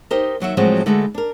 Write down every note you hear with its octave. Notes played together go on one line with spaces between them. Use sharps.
D#4 G4 A#4 C5 D#5
D#2 F#3 F#4 E5
A2 F3 F#3 G#3 C4 F#4
D3 G#3 A3 F#4 A4 B4
D4 A#4